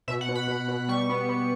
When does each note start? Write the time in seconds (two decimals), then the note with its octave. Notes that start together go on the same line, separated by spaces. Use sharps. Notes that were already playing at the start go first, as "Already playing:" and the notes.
0.08 B2 E5
0.21 F#5
0.29 B2
0.35 B5
0.48 B2
0.68 B2
0.89 G3 C#6
1.09 B3
1.29 B3